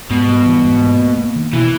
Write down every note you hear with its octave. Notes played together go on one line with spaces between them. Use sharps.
G#2 B2
G3
E3
G#2
A#3
A#3
A#3
D#3
B2 E3